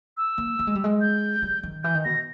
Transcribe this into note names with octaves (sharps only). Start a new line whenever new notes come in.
E6
A#3
A#3
G#3
G3
G#3
G6
G3
D#3
E3 G6
D#3
B2 A#6